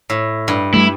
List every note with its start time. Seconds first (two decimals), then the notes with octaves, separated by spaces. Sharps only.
0.10 A2
0.48 G2
0.74 G3 A3 E4